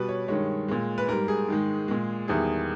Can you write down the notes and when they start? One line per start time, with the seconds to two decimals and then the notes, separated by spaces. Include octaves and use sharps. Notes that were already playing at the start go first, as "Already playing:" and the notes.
Already playing: B2 G3 B4
0.09 C#5
0.28 G2 D#3 G#3 C#5
0.68 A#2 G#3
0.98 B4
1.08 G#2 G3 A#4
1.28 G#4
1.48 G#2 D#3 G#3
1.88 A#2 G#3
2.28 E2 D#3 G3 G#4